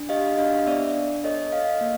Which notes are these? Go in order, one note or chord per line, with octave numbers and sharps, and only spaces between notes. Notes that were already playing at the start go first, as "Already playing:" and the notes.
Already playing: D4
G4 D#5 F5
D4 D#5 F5
B3 D5 E5
D4
A4 C#5 D#5
A4 D#5 F5
A#3